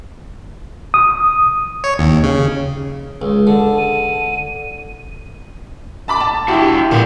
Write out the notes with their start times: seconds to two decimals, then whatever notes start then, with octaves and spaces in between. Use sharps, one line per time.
0.94 D#6
1.84 C#5
1.99 D#2
2.24 C#3
3.22 C#2
3.47 D3 A5
3.77 D#7
6.08 A5 B5 D6
6.20 A5
6.48 E4 F#4 G4
6.91 A#2 D3 G3 B3